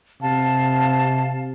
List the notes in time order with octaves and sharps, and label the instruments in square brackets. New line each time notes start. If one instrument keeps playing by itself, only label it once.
[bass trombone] C3 [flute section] F5 A5